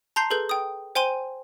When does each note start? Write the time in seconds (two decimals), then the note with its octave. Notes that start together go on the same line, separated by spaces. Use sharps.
0.16 A5 A#5 C6 G6 C7
0.30 G#4 A4 B4 G6
0.49 G5 D#6
0.95 C5 G5 G#5 C6 D#7 G7